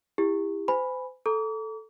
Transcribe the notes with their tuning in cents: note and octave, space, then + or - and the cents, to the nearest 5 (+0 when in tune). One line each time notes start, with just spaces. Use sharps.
E4 +0 G4 +35
C5 -40 G#5 +0 B5 +0
A4 +0 A#5 +0 D6 -45